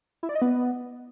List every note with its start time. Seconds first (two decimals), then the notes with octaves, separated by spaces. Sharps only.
0.23 E4
0.29 D5
0.35 D#5
0.42 B3